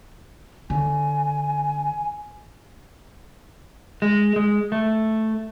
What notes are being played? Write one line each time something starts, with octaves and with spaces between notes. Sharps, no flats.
D3 G#5
G#3
G#3
A3